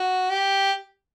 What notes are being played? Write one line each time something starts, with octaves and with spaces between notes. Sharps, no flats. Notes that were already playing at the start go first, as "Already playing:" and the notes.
Already playing: F#4
G4